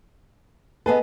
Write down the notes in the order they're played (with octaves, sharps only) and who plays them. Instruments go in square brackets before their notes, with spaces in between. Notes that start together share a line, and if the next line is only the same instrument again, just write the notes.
[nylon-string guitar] B3 G#4 A4 [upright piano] B4 D#5